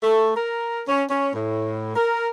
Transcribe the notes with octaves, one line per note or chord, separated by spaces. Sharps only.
A3
A#4
C#4
C#4
A2
A#4